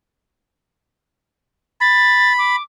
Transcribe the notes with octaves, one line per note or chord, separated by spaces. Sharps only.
B5 A6
D6